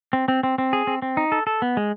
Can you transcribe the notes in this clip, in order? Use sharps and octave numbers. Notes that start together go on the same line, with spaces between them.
C4
C4
C4
C4
G#4
C4
C4
D#4
A4
A4
B3
G#3